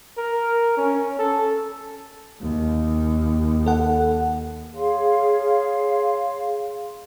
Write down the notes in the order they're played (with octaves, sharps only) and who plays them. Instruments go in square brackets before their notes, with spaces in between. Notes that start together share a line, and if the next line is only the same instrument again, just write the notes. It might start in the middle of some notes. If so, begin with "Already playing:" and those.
[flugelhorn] A#4
C#4
A4
[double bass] D#2
[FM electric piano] A4 F#5
[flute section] G#4 C#5 F5 C6